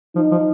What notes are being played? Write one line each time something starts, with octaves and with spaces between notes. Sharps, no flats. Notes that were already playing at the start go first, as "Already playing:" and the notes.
F3 D#4
F3